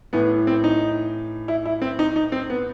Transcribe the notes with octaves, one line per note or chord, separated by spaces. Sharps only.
A2 E3 B3
C4
D#4
E4
E4
C4
D#4
D#4
C4
B3